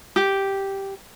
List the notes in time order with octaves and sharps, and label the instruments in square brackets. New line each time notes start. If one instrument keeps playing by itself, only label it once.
[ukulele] G4